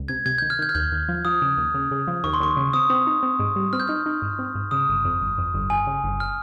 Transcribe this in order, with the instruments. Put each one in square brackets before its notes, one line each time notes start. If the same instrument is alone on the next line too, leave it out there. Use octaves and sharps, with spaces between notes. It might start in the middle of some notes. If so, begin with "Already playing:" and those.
Already playing: [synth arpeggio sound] C#2
[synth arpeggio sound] C3 [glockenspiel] G#6
[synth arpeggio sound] C3 [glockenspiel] G#6
[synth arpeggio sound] D#3 [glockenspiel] G6
[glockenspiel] F6
[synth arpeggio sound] D#3 [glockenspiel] G6
[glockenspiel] F6
[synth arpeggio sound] D#2 [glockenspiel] G6
[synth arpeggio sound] D#2
F3
[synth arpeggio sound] F3 [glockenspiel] D#6
[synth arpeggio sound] C#3
D#2
C#3
C#3
F3
[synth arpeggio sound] D#2 [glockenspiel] C#6
[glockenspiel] C6
[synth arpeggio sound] D#2 [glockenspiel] C#6
[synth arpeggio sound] C#3
[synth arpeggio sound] C4 [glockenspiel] D#6
[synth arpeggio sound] C4
D#4
C4
G#2
G3
[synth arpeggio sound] C4 [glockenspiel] F6
[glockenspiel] G6
[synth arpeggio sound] D#4 [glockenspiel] F6
[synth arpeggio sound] D#4
G#2
C4
G#2
[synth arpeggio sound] C#3 [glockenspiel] D#6
[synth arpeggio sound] G1
F2
G1
F2
G1
[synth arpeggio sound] G1 [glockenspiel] G#5
[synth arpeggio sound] C#3
G1
[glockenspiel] F6